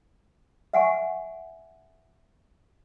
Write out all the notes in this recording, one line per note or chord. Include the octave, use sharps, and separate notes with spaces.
E5 F#5 G#5 C#6